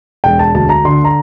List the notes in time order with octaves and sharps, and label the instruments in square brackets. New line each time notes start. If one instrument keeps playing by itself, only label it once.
[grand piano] E1 G5
A5
D2 A5
A#5
D3 C6
A#5